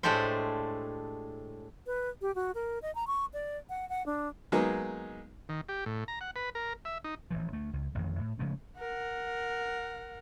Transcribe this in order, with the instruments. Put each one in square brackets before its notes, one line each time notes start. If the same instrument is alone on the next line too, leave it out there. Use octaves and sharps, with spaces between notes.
[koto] A2 G#3 A3 D4 G4 C5
[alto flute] B4
G4
F#4
A#4
D#5
A#5
C#6
D5
F#5
F#5
D4
[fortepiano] F#3 G#3 A#3 B3 D#4
[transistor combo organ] D#3
G4
A2
A#5
F#5
B4
A#4
E5
D#4
[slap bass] A1 E3 F3
D2 A3
C#2
A1 F2 D#3
A2
C#3 F3 G#3 A3
[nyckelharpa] A#4 [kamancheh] F#5